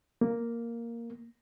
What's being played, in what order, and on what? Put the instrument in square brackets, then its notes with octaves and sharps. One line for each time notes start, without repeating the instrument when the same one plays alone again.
[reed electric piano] A#3